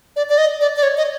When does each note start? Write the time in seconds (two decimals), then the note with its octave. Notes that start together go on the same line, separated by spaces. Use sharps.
0.16 D5
0.29 D5
0.38 D#5
0.61 D5
0.76 D5
0.83 C#5
0.97 D#5